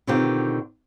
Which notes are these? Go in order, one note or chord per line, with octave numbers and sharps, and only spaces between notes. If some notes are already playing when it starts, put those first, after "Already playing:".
B2 D3 D#3 C4 F4 G4